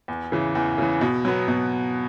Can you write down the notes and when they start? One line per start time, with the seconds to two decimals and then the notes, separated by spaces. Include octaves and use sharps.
0.08 E2
0.32 C#3 E3
0.55 E2
0.78 C#3 E3
1.01 B2
1.25 F#3 B3
1.48 B2